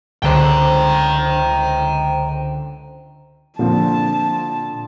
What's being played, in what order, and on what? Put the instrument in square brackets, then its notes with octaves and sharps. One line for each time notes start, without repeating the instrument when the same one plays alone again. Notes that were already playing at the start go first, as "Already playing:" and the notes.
[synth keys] C#2 D3 C5 [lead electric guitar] G5 A#5
[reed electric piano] A#2 [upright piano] D3 F3 C4 [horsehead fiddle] A5